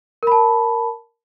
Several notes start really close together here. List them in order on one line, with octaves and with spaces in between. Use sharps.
A#4 B5 A5